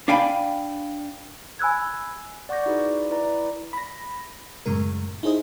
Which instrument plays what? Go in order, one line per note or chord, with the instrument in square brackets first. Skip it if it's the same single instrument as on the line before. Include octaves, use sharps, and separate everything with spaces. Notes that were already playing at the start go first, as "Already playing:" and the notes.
[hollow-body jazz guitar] D4 F5 G5 G#5 B5
[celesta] G#5 B5 E6 F#6 G#6
[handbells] D5 F#5 C#6 D6 G6 A#6
D#4 E4 F#4 G#4 B4 D5
E4 B4 D5 A#5
[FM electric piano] B5 A#6
F#2 A2 C#3 G#3 A#4
D#4 E4 G#4 C5 D#5